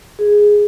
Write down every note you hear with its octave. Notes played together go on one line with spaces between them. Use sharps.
G#4